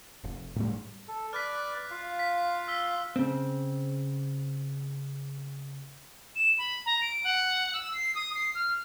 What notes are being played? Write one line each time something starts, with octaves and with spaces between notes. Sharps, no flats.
F1
A2 G3
A4
B4 D5 F6 F#6 B6
F4 F5
B6
E6 B6 G7
C#3 C4
E7
B5
A#5
D7
F#5
E6
C7
D#6
C7
F6